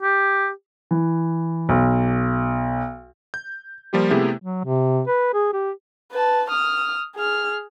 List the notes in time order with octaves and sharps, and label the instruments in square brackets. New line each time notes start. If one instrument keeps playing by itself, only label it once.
[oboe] G4
[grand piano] E3
B1
[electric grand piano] G6
F3 G3 A#3 F4 G4
C3 A3 B3 E4 G4 G#4
[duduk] F#3
C3
B4
G#4
G4
[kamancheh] B4 A5
D#6 F6
G#4 F6